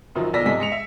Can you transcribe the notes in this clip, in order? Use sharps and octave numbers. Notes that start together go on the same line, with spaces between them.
F#2 D#3 F3 F#3
B1 F3 D5 E6 A#6 B6
G#2 C3 A4 D#5 G#5 B6
G#3 C#7 F7
E5